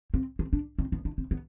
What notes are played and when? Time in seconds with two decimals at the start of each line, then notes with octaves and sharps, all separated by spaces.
0.14 C4
0.39 C4
0.53 D4
0.79 C4
0.92 B3
1.05 D4
1.18 C4
1.31 B3